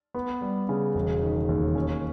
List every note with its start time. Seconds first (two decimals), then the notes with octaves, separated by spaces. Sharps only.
0.14 B3
0.42 G3
0.69 C#3
0.95 E1
1.22 D#3
1.49 D#2
1.75 C#4